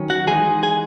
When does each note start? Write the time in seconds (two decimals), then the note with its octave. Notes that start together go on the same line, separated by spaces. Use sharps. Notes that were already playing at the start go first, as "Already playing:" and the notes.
Already playing: D#3 F#3 C#4
0.10 F#4 F#5
0.27 E3 G#3 D#4 G#4 G#5
0.63 G#4 G#5